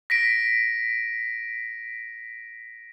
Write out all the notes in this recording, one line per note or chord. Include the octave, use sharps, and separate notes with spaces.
A#6 B6 D7